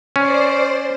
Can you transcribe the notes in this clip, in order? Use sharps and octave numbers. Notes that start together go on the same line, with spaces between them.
C#4 C5 D5 C6